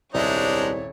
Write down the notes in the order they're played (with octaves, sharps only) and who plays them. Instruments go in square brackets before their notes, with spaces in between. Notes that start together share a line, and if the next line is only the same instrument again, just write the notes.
[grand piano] D#1 D5 E5 [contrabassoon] C2 [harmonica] G#3 D4 D#4 [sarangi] C#5